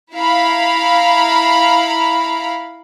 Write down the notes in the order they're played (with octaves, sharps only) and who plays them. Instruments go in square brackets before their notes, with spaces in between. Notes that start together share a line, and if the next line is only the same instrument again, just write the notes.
[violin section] E4 F5 A#5 B5